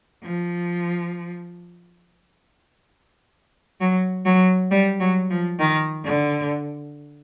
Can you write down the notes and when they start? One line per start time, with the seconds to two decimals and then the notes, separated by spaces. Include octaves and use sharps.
0.23 F3
3.81 F#3
4.26 F#3
4.71 G3
5.00 F#3
5.31 F3
5.59 D#3
6.05 D3